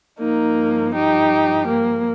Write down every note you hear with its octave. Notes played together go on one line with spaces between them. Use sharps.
G2 F3 A#3 D#4
D#4 G4
A#3